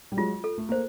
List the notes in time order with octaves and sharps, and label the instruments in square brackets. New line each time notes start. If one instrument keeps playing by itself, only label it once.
[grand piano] G3
[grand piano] F#3 G#3 [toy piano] F4
[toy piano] A4
[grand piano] A3
[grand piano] A#3 [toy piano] C5